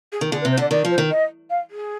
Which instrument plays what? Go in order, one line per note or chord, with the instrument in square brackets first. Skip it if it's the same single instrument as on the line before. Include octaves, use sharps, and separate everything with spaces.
[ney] G#4
[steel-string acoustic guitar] D#3
[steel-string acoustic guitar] D3 [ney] G#4
[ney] B4
[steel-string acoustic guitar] C3
[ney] C5
[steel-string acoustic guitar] D3 [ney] D5
[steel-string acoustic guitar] D#3 [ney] D5
[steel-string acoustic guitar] F3
[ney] C5
[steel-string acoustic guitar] D#3
[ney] D#5
F5
G#4